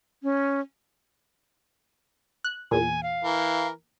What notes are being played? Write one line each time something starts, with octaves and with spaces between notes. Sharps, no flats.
C#4
F#6
E2 A#2 G#5
F5
E3 A#4